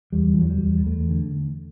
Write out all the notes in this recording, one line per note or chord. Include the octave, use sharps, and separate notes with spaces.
E2 G3
E3
E2 F#3
G3
E2
E2 A3
D3